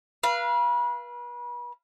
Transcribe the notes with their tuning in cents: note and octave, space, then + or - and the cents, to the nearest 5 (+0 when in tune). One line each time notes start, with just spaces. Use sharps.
B4 -35 F5 -20